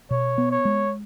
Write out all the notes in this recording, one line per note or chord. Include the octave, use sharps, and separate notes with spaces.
B2 C#5
B3
C#5
G#3